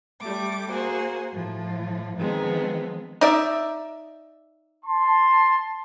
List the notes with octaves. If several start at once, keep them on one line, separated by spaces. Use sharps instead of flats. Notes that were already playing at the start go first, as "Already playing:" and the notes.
G3 A3 D6
A#3 F#4 G#4 C5
A2 F3
D#3 F3 G#3 B3 C4
D#4 D5 E5
A5 C6